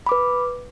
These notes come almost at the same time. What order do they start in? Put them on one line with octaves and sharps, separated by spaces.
B5 D6 B4